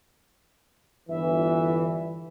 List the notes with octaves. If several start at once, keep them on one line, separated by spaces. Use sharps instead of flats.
G1 E3 E5